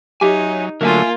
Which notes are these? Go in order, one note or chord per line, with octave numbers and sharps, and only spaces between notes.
F#3 D#4 G4 C#5 E5 G#5
D3 F#3 A3 A#3 F4 A#4 E5 G#5